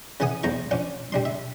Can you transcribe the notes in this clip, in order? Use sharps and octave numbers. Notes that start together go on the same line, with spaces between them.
C#3 E3 F#5 G#5 D#6
B1 E2 C5 A#5 C#6
F3 C#4 D4 F4
G3 D4 C6
E5